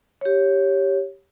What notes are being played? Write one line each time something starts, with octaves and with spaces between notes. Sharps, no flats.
G4 C#5